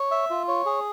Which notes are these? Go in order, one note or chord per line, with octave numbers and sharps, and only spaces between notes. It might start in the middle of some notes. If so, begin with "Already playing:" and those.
Already playing: C#5
E5
F4
C#5
G#4